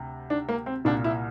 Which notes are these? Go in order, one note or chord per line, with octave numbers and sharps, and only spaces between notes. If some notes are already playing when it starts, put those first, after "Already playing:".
Already playing: D2 C3
D4
A#3
C4
C2 A#2 D4
E4